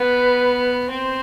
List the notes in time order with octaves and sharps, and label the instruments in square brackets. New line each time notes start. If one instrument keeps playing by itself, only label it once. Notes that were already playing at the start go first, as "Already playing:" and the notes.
Already playing: [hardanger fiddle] B3 [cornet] B4
[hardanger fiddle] C4 [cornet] C5